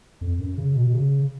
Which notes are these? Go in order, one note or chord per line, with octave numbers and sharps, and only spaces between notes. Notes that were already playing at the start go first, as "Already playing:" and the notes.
F2
F#2
C#3
B2
B2
C#3